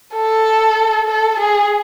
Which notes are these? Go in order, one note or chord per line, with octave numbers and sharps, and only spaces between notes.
A4
A4
G#4